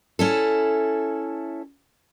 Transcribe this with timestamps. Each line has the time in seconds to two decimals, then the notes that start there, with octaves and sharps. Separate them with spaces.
0.19 C#4 E4 A4